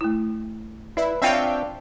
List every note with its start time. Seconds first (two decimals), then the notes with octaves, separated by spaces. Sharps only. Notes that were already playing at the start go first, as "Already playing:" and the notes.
0.01 A3 E4
0.97 E4 B4 D5
1.22 C4 D4 F4 C#5 E5 F5 G5